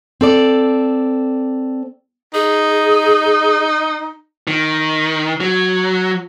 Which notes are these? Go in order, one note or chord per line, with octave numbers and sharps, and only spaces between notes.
C4 A4 D5
D#4 G#4
D#3
F#3